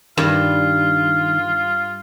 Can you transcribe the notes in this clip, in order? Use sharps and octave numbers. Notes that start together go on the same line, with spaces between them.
G2 D#3 F4